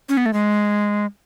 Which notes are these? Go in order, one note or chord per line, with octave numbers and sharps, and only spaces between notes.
C#4
B3
A3
G#3